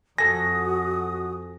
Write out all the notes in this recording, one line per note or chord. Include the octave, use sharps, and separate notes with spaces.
F2 F#4 A4 G#5 D#6 A#6